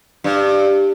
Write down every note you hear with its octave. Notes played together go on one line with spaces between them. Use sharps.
G2